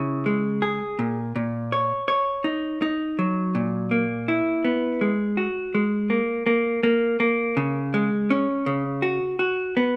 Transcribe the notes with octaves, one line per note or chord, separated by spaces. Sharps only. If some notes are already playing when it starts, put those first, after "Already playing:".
Already playing: C#3 E4
G#3
G#4
A#2
A#2
C#5
C#5
D#4
D#4
F#3
A#2
A#3
E4
B3
G#3
F#4
G#3
A#3
A#3
A#3
A#3
C#3
G#3
C#4
C#3
F#4
F#4
B3